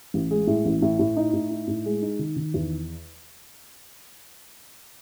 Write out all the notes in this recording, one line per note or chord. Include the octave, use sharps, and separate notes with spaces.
A1
G#3
A2
A1
A2
A2
D#4
A2
D#4
A2
G#3
D#4
D#3
D#3
E2